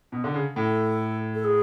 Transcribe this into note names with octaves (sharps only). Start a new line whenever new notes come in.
B2
D3
C#3
A2 A4
A4
G#4